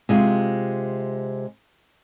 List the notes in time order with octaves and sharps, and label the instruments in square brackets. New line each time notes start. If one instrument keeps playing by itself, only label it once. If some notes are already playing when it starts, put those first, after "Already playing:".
[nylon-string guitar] C3 G#3 F4